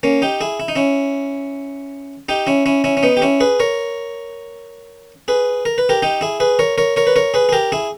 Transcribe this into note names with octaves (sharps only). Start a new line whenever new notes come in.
A#3 C#4
D#4 G4
E4 G#4
E4
D#4
C#4 E4
D#4 G4
C#4 E4
C#4 E4
C#4 E4
C#4
B3 D#4
G4
C#4 E4
G#4 B4
A#4 C#5
G#4 B4
A#4
B4
G4 A#4
D#4 G4
E4 G#4
G#4 B4
A#4 C#5
A#4 C#5
A#4 C#5
B4
A#4 C#5
G#4 B4
G#4
G4 A#4
E4 G#4